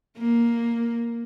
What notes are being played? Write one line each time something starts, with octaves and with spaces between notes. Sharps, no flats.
A#3